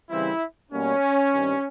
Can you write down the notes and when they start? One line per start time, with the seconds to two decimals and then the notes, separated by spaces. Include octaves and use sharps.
0.10 C#3 E3 G3 C4 E4
0.72 B2 G3 A#3 C#4
1.33 G2 D#3 G3 C4